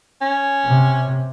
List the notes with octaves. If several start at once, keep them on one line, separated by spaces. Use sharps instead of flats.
C#4
C3